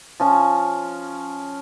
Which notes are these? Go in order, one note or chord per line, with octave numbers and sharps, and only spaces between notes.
F3 C#4 F4